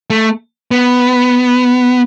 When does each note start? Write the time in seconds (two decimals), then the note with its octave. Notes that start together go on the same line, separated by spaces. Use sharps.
0.10 A3
0.71 B3